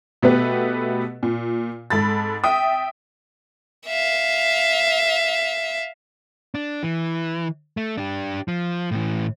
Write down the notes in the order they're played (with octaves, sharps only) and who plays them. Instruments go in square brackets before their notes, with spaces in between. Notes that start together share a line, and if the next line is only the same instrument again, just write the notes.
[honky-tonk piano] B2 A3 B3 G4 B4
A#2
G#2 A4 B5 A6
E5 G5 D#6
[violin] E5 F5
[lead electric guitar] D4
E3
A3
D4 G4
F3
A2 E3